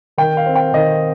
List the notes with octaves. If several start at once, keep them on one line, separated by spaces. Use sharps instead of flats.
D#3 G5
F5
C4
G5
D#3 D#5